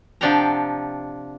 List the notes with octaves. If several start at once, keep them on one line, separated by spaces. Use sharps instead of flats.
C3 F3 D4 F#5 G5 A#5